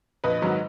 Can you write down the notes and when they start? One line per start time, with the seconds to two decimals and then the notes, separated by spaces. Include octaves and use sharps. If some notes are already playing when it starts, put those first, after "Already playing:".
0.24 A#1 B4 D#5
0.42 G#2 D#3 F#3